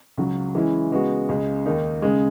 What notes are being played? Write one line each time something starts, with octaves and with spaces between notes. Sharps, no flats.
C#2 C#3 F#3
E3 G#3 C#4 E4
C#3 G#3 B3 F#4
C#2 C#3 G#3
D#2 D#3 A#3 D#4
C#3 G#3